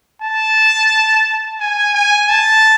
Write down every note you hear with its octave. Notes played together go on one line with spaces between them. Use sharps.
A5
G#5
G#5
A5